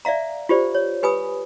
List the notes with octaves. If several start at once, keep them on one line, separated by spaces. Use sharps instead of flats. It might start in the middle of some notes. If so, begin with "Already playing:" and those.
D5 E5 F5 A#5
F4 G4 C5 D5
C#5
G4 B4 G#5 B5 D#6